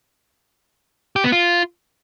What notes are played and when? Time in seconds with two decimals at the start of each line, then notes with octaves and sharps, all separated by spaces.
1.16 G4
1.24 B3
1.32 F4